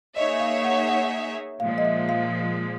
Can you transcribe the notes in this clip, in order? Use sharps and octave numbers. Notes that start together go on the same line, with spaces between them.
A#3 D#4 G#4 C#5 D#5 E5
F5
F#5
F#5
A#2 F3 G#3 F5
D#5
E5
F5